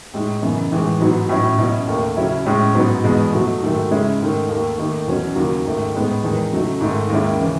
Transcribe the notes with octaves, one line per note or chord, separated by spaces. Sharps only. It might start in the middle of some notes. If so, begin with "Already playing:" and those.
A2 G#3 D#4
F#2 C#3 E3 B3 D#4
A2 E3 G#3
G#2 F#3 B3 D#4
A2 F#3 C#4 E4
B2 F#3 C#4 E4
D#2 D#3 A3
C#3 F#3 C#4 E4
A2 G#3 C#4
G#2 F#3 B3 D#4
E2 B2 G#3 B3
B2 F#3 A3
G#2 D#3 F#3 A3
C#3 G#3 C#4 E4
G#2 D#3 A3 D#4
D#2 D#3 A3
D#2 D#3 A3 D#4
E2 B2 F#3 C#4
D#2 C#3 F#3
G#2 D#3 A3
A2 G#3 B3 D#4
E2 D#3 G#3 D#4
C#3 F#3 A3 D#4
G#2 D#3 A3 D#4
D#2 D#3 G#3 C#4 E4
C#3 E3